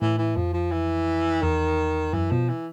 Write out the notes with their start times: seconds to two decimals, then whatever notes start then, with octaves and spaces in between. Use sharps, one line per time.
0.02 A2 E3
0.18 E3
0.36 F2 F3
0.54 F3
0.72 E3
1.42 E2 D#3
2.13 F#2 E3
2.31 B2 F3
2.49 E3